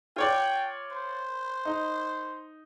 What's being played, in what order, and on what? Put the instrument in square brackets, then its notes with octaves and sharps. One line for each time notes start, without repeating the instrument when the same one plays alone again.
[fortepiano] F4 C#5 D5 [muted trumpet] G5
[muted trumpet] C5
[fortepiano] D#4